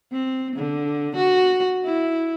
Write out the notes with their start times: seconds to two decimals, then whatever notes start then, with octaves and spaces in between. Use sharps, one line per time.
0.12 C4
0.56 D3
1.16 F#4
1.84 E4